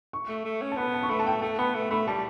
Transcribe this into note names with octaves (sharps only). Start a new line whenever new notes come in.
C#6
A3
A3
C#4
A5
B3 B5
A5
C#6
A3 B5
A5
G5
A3 A5
B3 B5
A3
A3 B5
G3 A5